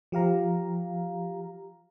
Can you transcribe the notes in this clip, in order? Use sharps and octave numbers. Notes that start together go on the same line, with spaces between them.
F3 G4 F5 A#5